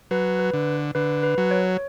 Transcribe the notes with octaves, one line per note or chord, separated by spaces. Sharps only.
F#3 B4
B4
D3
D3 B4
B4
F#3
C#5